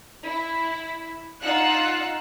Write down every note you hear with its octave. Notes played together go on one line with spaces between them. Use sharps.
E4
D#4 F4 F#5 E6 F#6